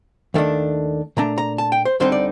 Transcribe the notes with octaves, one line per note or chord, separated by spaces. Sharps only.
D#2 D#3 A3 D4
A#2 A3 D4 A#5
A#5
A5
G5
C5
D2 D3 G3 C4 D#4 C5
D5